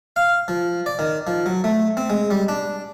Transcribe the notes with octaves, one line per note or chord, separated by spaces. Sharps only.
F5
F3
D5
D#3
F3
F#3
A3
C4
G#3
G3
D4